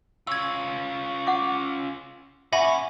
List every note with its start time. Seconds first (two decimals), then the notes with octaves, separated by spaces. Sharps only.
0.27 C#4 F4 E6 G#6
1.27 F#5 D6
2.52 A#2 C#4 E5 F#5 G#5 B5